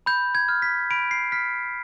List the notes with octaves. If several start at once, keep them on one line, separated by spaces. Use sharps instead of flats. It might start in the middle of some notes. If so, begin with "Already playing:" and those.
B5 G6
G#6
F6
B6
B5 D7
C7
F6 B6